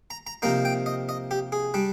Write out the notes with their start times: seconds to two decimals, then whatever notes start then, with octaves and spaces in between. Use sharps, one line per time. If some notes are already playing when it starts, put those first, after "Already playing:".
0.10 A#5
0.27 A#5
0.42 C3 F3 A#3 D#4 A#5
0.65 G5
0.86 D#5
1.09 D#5
1.31 G4
1.52 G#4
1.74 G3 D4